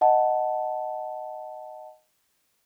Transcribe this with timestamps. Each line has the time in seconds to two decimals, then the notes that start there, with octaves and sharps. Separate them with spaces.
0.01 D#5 F#5 A5